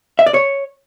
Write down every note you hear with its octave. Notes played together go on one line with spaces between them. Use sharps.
E5
D5
C#5